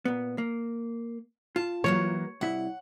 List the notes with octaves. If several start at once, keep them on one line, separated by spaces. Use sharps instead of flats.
A#2 B3
A#3
F4 A5
E3 F#3 A#3 C#5
C2 E4 F#5